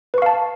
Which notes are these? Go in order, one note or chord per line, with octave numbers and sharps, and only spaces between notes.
B4 F5 A5 C#6